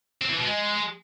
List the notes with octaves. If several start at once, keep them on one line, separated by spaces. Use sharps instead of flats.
C4
E3
B2
G#3